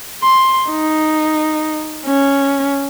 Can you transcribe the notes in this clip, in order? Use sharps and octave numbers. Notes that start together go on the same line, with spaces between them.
C6
D#4
C#4